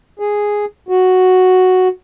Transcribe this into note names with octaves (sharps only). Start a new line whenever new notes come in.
G#4
F#4